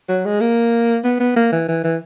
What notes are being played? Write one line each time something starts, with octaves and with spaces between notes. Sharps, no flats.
F#3
G#3
A#3
B3
B3
A#3
E3
E3
E3